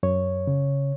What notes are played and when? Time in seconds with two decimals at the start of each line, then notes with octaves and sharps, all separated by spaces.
0.03 F#2 C#5
0.47 C#3